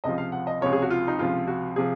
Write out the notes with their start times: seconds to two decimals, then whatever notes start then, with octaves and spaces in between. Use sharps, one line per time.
0.04 C#2 C3 F3 D#5
0.18 F5
0.32 F#5
0.47 D#5
0.61 C#2 C3 F3 C#5
0.72 G#4
0.82 F#4
0.90 F4
1.08 D#4
1.19 C#2 C3 F3 F4
1.47 F#4
1.76 C3 F3 G#4